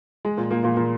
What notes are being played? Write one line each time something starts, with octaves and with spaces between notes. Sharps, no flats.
G#3
A#2 A#3
A#2 A#3
A#2 A#3
A#2 A#3